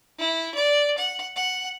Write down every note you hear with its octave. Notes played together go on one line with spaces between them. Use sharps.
E4
D5
F#5
F#5